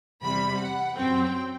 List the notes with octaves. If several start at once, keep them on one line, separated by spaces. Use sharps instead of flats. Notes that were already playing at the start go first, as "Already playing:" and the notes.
E2 C3 G3 B5
F#5
F#2 F#3 C4 G5